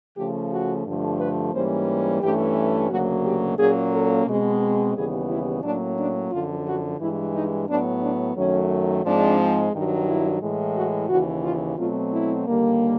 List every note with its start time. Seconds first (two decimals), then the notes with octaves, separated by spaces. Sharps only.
0.17 C#3 F3 A3 G4
0.51 F#4
0.86 G2 D3 F3 A3
1.20 B4
1.54 G#2 E3 G3 A#3 C#4 C5
2.22 G2 E3 A3 C#4 G4
2.90 D2 C#3 F#3 A#3 F#4
3.25 G4
3.58 A#2 F#3 A#3 C#4 G#4
3.92 A4
4.26 B2 G#3 C4
4.95 D#2 C#3 E3 G3 B3 G#4
5.29 E4
5.63 A2 F#3 A#3 C#4 D4
5.98 D4
6.32 F#2 D3 F3 F4
6.66 F#4
7.00 G2 E3 G#3 E4
7.35 D#4
7.69 A2 F#3 B3 D4
8.02 D4
8.36 F#2 D#3 F#3 A3 C#4
9.04 G#2 F3 G#3 C4 D4
9.73 G2 D#3 F#3
10.07 E4
10.41 A2 E3 G#3
10.76 F#4
11.09 D#2 C#3 E3 F#4
11.43 F4
11.78 B2 F#3 A3 C4 F4
12.12 E4
12.47 D#2 D3 G3 A#3